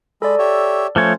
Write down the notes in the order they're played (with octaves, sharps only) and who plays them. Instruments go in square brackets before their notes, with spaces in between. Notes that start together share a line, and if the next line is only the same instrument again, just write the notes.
[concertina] G#3 B5 [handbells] A4 D5
[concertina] G4 C#5 E5
[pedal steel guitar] F3 A3 C#5 [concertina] C#4 C5